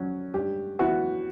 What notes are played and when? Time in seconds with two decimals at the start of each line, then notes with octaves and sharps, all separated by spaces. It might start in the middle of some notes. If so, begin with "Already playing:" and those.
Already playing: F#3 C#4
0.34 G2 G4
0.79 E3 B3 E4 F#4